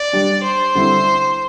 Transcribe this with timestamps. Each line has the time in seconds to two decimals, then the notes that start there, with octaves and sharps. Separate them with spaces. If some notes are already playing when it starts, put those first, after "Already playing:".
Already playing: D5
0.13 G3 D4 G4
0.43 C5
0.75 D3 G3 C4 E4